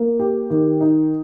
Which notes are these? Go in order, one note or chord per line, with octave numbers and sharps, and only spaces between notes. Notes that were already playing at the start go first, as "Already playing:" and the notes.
Already playing: A#3
G4
D#3
D#4